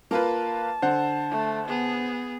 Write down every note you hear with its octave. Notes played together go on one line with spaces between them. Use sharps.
A#3 F4 B4 A5
D3 C5 F#5
A3
B3 G#4